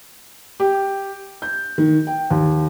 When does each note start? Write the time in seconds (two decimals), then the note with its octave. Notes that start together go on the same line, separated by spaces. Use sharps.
0.60 G4
1.42 G6
1.78 D#3
2.07 G5
2.30 D#2